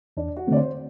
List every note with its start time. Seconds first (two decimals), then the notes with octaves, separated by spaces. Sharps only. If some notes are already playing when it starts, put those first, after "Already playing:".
0.17 E2 D4
0.37 F#4
0.47 D3 A3 C4 D5
0.57 C5